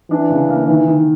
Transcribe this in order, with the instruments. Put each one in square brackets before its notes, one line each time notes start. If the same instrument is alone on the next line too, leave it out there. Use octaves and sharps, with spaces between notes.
[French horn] E3 [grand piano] D4
[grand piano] C#3
A#3
[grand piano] D#3 [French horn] E3
[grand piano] D#3